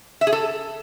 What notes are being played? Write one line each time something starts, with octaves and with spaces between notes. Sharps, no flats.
E5
G#4
A4